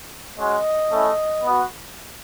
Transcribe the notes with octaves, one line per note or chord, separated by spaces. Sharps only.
G#3 C#4 F#4 D#5
A3 C#4 E4
B3 F#4